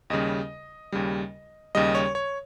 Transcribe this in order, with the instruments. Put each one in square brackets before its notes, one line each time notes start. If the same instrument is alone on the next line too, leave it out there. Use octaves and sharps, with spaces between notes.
[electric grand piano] D#2 C#3 G3 D#5
D#2 C#3 G3
D#2 C#3 G3 D#5
C#5
C#5